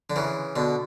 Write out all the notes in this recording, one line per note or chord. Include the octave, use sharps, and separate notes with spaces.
D3
C#3 E3
B2 D3